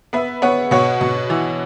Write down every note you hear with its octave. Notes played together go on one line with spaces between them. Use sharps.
B3 B4 E5
B3 C#5 F#5
B2 C#5 F#5
B2
E3